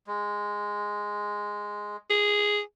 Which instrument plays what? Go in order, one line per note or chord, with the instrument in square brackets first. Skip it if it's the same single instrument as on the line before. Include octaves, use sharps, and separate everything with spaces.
[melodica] G#3
[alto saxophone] G#4